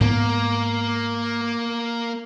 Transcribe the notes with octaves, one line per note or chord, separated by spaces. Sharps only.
G#2 A#3 B3